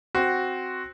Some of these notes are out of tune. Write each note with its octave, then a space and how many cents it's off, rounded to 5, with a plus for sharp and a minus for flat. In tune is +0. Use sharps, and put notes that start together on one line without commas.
C4 +0 F#4 +0